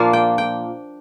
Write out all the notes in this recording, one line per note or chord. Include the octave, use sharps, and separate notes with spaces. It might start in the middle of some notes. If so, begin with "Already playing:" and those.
Already playing: A#2 F3 A#3 D4 F5
G5
G5